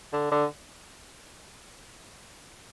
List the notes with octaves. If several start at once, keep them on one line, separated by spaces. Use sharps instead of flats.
D3
D3